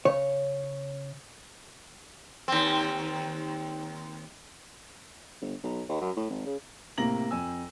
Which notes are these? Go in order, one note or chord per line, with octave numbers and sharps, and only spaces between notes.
C#3 C#5
D#2 C4
G1
B1
D#2
F#2
A2
G#1
C#3
A2 C3 A#3 A#5 A#6 F#7
F2 G#5 E6